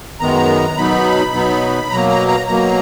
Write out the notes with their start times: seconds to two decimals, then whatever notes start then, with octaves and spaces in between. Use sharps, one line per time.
0.20 F#2 D#3 G#3 B3 A#5
0.77 B2 F#3 B3 D#4 B5
1.34 B2 F#3 B3 D#4
1.91 B2 F#3 A#3 A#5
2.10 A#5
2.28 A#5
2.47 B2 F#3 A#3 A#5